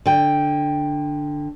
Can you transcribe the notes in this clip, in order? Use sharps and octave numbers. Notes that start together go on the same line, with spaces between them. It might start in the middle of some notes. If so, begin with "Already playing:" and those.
D3 G5